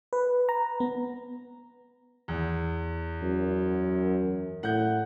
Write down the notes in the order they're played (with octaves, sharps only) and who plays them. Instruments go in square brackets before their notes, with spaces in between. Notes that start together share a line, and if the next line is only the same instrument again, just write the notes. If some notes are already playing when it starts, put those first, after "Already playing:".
[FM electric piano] B4
A#5
B3
[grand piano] E2
[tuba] F#2
[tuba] A2 [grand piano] F#5 G6